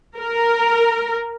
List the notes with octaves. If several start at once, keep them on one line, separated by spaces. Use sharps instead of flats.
A#4